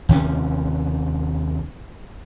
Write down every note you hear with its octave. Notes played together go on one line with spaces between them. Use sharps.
D#2 C3 C#4